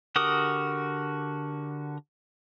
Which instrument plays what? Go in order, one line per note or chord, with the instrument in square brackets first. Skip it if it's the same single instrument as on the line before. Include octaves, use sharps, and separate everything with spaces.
[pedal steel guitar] D3 F#4 G4 A#4 D#6